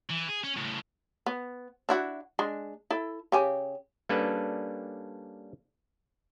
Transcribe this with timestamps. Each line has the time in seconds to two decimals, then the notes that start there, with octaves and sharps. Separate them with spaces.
0.10 E3
0.28 G#4
0.44 C#4
0.57 A2 C#3
1.26 B3
1.89 D4 E4 F#4
2.39 G#3 D4
2.91 E4 A4
3.32 C#3 G4 G#5
4.09 G3 A#3 C#4 D4 A4 B4